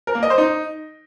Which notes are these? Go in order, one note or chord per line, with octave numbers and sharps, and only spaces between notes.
A#4
A#3
D#5
C5
D#4